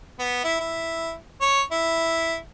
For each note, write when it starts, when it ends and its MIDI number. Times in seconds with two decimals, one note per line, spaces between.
0.19 0.43 59
0.44 0.57 64
0.60 1.13 64
1.41 1.61 73
1.72 2.36 64